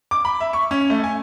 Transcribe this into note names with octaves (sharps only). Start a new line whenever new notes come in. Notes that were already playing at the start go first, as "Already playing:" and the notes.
D6
B5
E5
C#6
C#4
A3
G#5